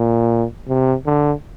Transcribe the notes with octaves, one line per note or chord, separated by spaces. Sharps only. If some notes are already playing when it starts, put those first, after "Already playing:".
Already playing: A#2
C3
D3